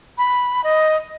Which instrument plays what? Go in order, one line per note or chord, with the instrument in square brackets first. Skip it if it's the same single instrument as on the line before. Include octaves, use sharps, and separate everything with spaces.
[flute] B5
D#5